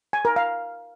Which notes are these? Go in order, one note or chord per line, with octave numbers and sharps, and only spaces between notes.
G#5
A#4
F5